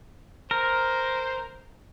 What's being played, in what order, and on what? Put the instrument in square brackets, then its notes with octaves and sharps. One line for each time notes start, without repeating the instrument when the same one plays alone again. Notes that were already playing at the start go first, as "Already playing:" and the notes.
[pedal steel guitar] A#4 [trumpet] C5